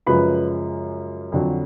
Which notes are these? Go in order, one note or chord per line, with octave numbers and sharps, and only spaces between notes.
F#2 C#3 F3 G#3 B4 B5
F2 D3 F#3